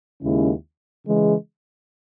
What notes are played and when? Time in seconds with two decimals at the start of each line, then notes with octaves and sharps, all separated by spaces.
0.22 D#2 C#3 G#3 C#4 E4
1.05 C#3 E3 G#3